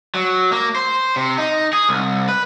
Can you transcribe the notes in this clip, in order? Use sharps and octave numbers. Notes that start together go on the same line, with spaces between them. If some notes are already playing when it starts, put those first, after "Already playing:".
F#3
A#3
C5
C3
D#4
G#4
C2
B4